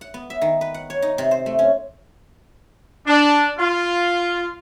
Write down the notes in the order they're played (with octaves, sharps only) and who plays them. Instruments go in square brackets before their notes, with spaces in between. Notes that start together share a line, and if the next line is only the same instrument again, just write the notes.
[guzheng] F#5
B3
E5
D#3
B4
F#5
C#5
D#4
C3
C5
A3
C#4
[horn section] D4
F4